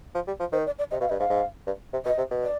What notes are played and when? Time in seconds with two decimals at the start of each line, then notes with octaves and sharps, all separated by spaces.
0.15 F3
0.27 G3
0.40 F3
0.52 D#3 C5
0.66 D5
0.79 D5
0.91 C3 D#5
1.00 B2 F5
1.09 G2 D#5
1.19 G#2 F5
1.30 G#2
1.67 G2
1.93 C3
2.05 B2 D#5
2.18 C3
2.31 B2
2.43 D5